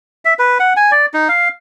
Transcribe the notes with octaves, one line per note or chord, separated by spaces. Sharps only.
E5
B4
F#5
G#5
D5
D#4
F5